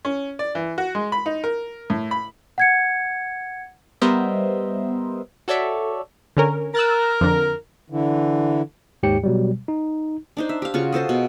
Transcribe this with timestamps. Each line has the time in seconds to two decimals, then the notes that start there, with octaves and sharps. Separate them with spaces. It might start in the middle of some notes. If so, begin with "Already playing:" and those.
0.05 C#4
0.39 D5
0.55 E3
0.78 F#4
0.95 G#3
1.12 B5
1.26 D#4
1.44 A#4
1.90 A2
2.11 B5
2.58 F#5 G#6 C#7
4.02 G3 B3 A#4 C5 D#5 E5
5.48 F#4 A4 C#5 D5 E5
6.37 D3 C#4 A#4
6.75 A#4 E6 F#6 A6
7.21 F2 D3
7.90 D3 E3
9.03 D#2 G#2 G4 C#5 G5 C#7
9.23 B2 F#3 G3
9.68 D#4
10.37 D4 D#4 C5
10.49 E5
10.62 G4 F5
10.74 C#3 F4 F#4 C#6
10.92 G#4 A4 C5 D#5
11.09 B2